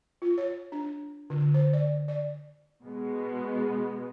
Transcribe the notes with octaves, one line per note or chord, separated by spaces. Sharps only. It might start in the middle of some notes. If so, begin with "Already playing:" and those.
F4
C#5
D4
D3
C5
D5
D5
B2 G#3 B3